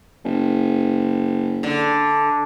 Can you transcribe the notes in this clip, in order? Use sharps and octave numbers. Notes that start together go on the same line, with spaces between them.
F#1
D3